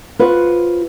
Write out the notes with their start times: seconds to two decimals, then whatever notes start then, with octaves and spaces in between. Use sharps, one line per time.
0.19 F4 F#4 B4 C5